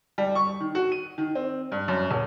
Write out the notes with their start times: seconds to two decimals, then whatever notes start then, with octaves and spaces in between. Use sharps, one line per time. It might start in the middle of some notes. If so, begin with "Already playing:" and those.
0.18 G3
0.35 C#6
0.60 D#3
0.75 F#4
0.92 D#7
1.18 D#3
1.35 C4
1.72 G2
1.88 F#2
2.11 D#1